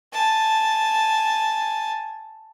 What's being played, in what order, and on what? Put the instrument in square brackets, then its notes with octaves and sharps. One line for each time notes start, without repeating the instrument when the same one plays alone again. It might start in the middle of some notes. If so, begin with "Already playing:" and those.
[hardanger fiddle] G#5 A5